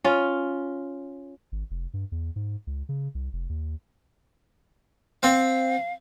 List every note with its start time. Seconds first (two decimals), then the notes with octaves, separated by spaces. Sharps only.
0.04 C#4 F4
1.52 G#1
1.71 F1
1.94 G2
2.12 E2
2.36 G#2
2.67 C#2
2.89 C#3
3.15 C2
3.33 F1
3.49 D#2
5.23 C4 F5